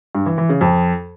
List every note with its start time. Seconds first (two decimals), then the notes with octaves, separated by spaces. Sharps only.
0.15 G2
0.26 E3
0.38 E3
0.49 C#3
0.61 F2